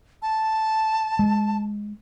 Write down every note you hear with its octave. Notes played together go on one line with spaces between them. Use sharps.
A5
G#3